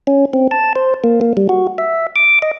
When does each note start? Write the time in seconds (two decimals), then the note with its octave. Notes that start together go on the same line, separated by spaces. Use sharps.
0.07 C#4
0.33 C4
0.51 A5
0.76 C5
1.04 A#3
1.21 A#3
1.37 G3
1.49 F#4
1.78 E5
2.16 D6
2.42 D#5